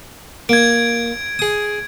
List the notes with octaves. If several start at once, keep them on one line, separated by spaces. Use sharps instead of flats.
A#3 G#6 D7
G#4 D#6